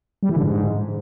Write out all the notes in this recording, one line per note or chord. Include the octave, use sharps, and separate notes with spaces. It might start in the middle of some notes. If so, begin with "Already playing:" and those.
G3
E3
D3
G#2